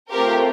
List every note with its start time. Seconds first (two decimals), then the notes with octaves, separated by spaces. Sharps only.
0.11 A3 C4 F4 G4 A#4 C5 G5